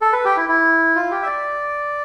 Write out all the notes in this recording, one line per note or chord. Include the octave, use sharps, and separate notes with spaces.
A4
B4
G4
E4
E4
F4
G4
E5
D5